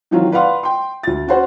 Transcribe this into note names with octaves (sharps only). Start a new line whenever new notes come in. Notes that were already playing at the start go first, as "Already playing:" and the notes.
D#3 E3 F#3 C4 F4
B4 D5 F5 F#5 C6
G5 C6
D2 A6
C#4 F#4 C5 F#5